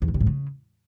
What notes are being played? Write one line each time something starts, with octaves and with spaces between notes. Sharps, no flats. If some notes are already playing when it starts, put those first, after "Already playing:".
E2
G2
C3
G#2
C#3